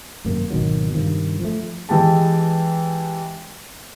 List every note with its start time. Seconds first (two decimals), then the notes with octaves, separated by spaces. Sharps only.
0.25 G#1 F#2 C3 A#3
0.50 G#1 B2 D#3 F#3
0.93 G2 C3 D#3 F3
1.40 F3 A3
1.89 E3 G#3 G4 A5